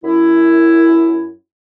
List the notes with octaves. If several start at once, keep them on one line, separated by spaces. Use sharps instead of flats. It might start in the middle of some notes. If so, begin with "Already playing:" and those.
F#2 E4